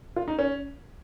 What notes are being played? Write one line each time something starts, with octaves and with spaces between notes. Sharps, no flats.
F4
D#4
C#4